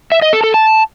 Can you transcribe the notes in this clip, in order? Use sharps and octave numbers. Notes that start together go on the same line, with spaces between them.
E5
D#5
A4
A4
A5